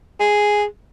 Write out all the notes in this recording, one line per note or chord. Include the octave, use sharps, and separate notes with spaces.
G#4